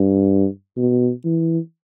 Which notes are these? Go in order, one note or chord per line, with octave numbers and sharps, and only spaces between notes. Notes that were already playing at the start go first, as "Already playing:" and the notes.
Already playing: G2
B2
E3